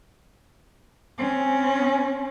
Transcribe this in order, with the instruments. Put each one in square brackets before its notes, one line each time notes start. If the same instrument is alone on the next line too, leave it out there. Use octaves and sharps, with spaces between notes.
[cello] C4 C#4